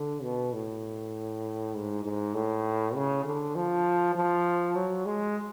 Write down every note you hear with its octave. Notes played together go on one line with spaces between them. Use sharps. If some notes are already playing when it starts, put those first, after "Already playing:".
Already playing: D3
B2
A2
G#2
G#2
A2
C#3
D3
F3
F3
F#3
G#3